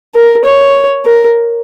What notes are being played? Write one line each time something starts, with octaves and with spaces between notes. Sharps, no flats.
A#4
C#5
A#4